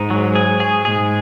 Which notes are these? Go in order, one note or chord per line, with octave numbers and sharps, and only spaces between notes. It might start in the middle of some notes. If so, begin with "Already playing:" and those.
Already playing: G#2 D#4
F#3
G#4
G#4
G#2 G#4